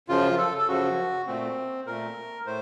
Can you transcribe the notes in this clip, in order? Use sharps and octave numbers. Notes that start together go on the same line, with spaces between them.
F#2 C#3 F3 F4
A4
A4
F#2 C#3 F3 F#4
A#2 A3 C4
A#2 A3 A#4
A2 A3 C5